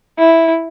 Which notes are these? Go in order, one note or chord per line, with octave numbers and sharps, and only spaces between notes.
E4